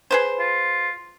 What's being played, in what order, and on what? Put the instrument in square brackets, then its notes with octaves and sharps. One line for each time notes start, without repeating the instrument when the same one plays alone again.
[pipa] G#4 B4 C5
[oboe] F4